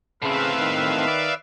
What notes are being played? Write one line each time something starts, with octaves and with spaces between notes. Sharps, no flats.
A2 C#3 C4 B4 E5 F5
D#3
D5